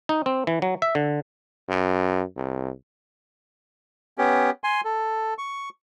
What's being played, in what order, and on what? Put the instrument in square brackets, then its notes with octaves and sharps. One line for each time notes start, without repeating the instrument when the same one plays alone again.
[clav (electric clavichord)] D#4
C4
E3
F#3
E5
D3
[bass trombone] F#2
C2
[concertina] B3 C#4 G4
G#5 C6
A4
C#6